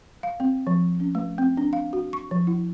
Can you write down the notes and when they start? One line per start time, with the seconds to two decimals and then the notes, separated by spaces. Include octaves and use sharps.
0.23 F5
0.40 C4
0.67 F3
1.00 C#4
1.15 A3
1.38 C4
1.57 D4
1.73 F5
1.93 F#4
2.13 C#6
2.31 F3
2.47 E4